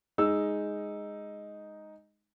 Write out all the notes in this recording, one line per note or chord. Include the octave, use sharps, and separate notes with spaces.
G#3 D#4 E6